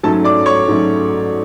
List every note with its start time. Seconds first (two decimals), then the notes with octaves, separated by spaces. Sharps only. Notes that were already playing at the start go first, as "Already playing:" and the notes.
0.03 G#2 F#3 A3 C#4 A4 A5
0.24 D5 D6
0.46 C#5 C#6
0.68 G#2 F#3 A3 C#4